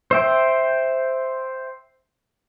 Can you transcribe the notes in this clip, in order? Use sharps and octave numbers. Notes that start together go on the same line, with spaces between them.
C5 E5 G5